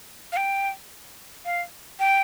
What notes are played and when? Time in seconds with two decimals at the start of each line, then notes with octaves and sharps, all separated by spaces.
0.32 F5
0.37 G5
1.45 F5
2.00 G5